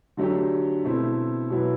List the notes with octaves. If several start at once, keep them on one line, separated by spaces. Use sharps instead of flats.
D3 F#3 A3 D4 G4
B2 A3 C4 E4
B2 F#3 B3 E4